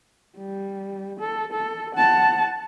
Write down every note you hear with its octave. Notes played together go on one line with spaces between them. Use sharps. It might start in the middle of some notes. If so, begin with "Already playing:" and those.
G3
A4
A4
F#5 A5